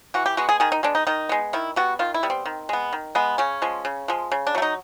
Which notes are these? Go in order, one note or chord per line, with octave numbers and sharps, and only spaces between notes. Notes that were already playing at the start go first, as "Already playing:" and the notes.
E3 F#4
G4
G#3 B3 F#4
G#4
D#3 G#4
D#4
G#3 B3 D4
D#4
D#3 D#4
G#3 B3
D#3 E4
G3 B3 F#4
D#3 F4
E4
G3 B3
C4
D#3
G#3 B3
D#3
G#3 B3
C#3 C#4
F3 G#3
C#3
F3 G#3
C#3
D4
F#3 A3
D#4